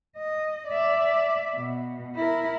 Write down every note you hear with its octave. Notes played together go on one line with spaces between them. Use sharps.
D#5
D5 E5
B2
E4 A#4